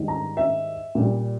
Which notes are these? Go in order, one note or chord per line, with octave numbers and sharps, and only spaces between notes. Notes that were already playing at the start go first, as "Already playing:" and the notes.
Already playing: G#2 D#3 G3
A#5
E5
A#2 G3